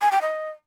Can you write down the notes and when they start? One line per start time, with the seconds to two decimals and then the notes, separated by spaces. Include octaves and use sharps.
0.02 G#5
0.12 G5
0.22 D#5